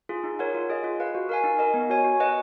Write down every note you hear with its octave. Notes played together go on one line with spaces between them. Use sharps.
F4 G#4
D#4
A#4 C#5 F#5
F4
G#4 D#5
F4
B4 F5
F#4
A#4 F5 G#5
D#4
A#4 D#5
B3
F#4 C#5 G#5
F#4
B4 D#5 F#5